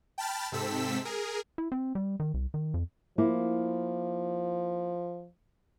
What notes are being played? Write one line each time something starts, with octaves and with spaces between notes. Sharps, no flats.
G5 A5 B5 F6 A6
G#2 C3 C4 A4 E6 B6
G#4 A#4
E4
C4
G3
D#3
C2
D#3
F2
F3 A#3 E4